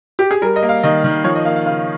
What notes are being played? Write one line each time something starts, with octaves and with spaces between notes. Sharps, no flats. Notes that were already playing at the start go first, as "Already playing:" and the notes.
G4
G#4
G3 A#4
D#5
A#3
F5
D#3 D#5
D#3
F3 C#5
D#5
A#3 F5
F5
C#3 F5